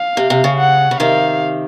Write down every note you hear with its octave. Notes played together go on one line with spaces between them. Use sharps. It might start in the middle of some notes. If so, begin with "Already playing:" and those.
Already playing: F5
C3
C3
C#3
F#5
C#3
C3 D#3 F5